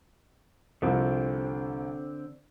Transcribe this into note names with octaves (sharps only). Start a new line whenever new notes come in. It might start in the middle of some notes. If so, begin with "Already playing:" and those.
C2 D3 F3 C4